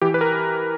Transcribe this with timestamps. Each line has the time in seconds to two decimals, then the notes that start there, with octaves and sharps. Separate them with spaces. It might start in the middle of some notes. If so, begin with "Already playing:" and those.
0.02 E3 G4
0.14 B4
0.21 A#4